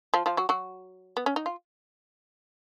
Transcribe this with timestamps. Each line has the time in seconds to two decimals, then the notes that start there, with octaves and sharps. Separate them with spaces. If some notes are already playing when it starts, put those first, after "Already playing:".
0.14 F3 F4
0.26 F3 F4
0.37 F#3 F#4
0.49 F#3 F#4
1.17 B3
1.26 C#4
1.36 D#4
1.46 F4